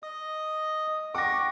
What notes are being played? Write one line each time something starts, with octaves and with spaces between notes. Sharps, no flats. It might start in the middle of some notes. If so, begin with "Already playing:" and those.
D#5 D#6
F#5 G5 C#6 D6 A#6